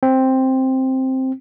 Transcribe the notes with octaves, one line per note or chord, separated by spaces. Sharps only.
C4